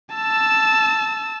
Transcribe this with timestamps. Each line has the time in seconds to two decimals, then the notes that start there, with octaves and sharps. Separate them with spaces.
0.15 A5 E6